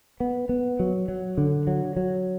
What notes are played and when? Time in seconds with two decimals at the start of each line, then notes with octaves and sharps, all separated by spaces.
0.20 B3
0.49 B3
0.80 F#3
1.08 F#3
1.38 D3
1.67 F#3
1.96 F#3